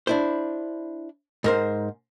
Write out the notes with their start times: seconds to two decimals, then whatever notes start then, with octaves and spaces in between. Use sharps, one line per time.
0.07 D4 E4 C5
1.44 G#2 A#4 C5